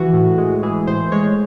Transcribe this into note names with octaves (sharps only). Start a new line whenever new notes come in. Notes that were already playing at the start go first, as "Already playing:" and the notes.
Already playing: E3 F#4
A2
G#3
E3 G#4
A2 C5
G#3 C#5